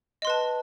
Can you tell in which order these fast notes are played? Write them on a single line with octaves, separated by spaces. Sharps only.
D#5 C6 B4 A5